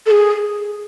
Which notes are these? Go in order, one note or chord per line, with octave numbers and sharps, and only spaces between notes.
A4
G#4